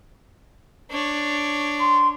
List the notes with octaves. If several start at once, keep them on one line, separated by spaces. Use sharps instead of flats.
D4 C#5
C6